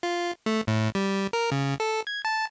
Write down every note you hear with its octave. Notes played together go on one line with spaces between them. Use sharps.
F4
A3
A2
G3
A#4
C#3
A4
G#6
A5